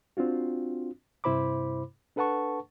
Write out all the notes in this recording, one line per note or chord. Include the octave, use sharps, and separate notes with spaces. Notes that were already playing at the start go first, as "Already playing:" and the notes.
C4 D4 F4 F#4
G2 C3 E4 C5 B5 D6
D4 A4 B4 F#5 A5 C#6